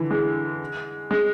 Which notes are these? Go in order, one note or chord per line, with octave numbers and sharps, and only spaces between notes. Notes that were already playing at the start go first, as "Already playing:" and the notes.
Already playing: D3 E3
G#3
G#3